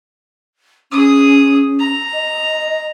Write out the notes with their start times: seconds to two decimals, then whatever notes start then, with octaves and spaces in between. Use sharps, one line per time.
0.92 C#4 G#4 D#6
1.79 A#5
2.14 D#5